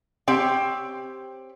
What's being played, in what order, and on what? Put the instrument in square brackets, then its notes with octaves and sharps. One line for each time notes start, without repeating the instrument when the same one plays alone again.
[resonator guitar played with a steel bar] C4 G4 C#5 G5